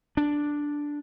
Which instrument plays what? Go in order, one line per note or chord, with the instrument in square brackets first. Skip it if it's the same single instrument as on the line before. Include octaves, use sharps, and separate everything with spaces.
[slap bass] D4